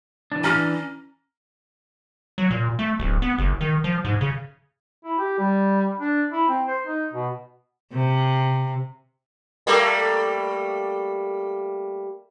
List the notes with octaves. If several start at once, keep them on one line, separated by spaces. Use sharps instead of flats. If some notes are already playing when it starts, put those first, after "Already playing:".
E3 D4
C#4 A#5 F6
F#3
A#2
A3
D1
B3
F#1
D#3
F3
G#2
C#3
E4
G4
G3
D4
E4
C4
C5
D#4
B2
C3
G3 A3 A#3